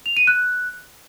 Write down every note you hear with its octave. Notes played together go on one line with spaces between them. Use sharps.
F7
D#7
F#6